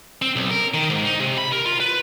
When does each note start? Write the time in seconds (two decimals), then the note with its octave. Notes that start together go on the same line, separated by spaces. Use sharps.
0.22 C4
0.36 B1
0.50 A#4
0.74 D#3
0.90 G#2
1.05 D#4
1.20 C3
1.38 B5
1.53 A#4
1.65 F4
1.80 B4